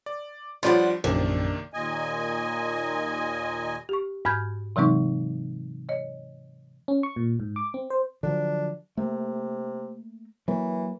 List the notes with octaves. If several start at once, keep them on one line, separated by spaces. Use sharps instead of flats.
D5
G2 F3 F4 D5 F#5 B5
A#1 F#2 C3 D#3 A#3 D4
D#2 A#2 D#5 G#5
G4 C#6
G#2 B5 F6 G6 G#6
C3 E3 F#3 G#3 C4 D#4
C#5 D#5
C#4
C#6
A#2
G#2
D6
C4
C5
D3 F3 F#3 D4
C3 A3 A#3
E3 F#3 A#3